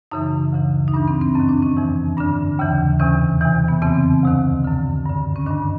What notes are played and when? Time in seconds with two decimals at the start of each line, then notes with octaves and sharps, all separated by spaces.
0.11 F#2 C#3 E3 D#4
0.53 D2 C#3 E3
0.88 D#4
0.94 G2 E3 D4
1.08 C4
1.21 C4
1.35 F#2 D#3 C#4
1.49 D4
1.62 C#4
1.77 F2 C3 E3
2.18 G2 D3 D4
2.59 D#2 C#3 E3
3.00 E2 C3 E3 C#4
3.41 E2 C3 E3
3.68 B3
3.81 F2 C#3 E3 C4
4.23 D2 C3 D#3
4.64 F#2 D3
5.06 G2 D3
5.36 C#4
5.46 G2 D#3 D4